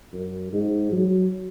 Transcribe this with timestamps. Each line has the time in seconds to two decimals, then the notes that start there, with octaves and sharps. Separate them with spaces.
0.13 F#2
0.52 G#2
0.92 F#3